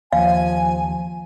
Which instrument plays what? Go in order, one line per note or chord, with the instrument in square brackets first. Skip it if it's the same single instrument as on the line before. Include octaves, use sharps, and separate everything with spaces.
[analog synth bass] D#2 [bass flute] F3 [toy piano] F5 [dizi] G#5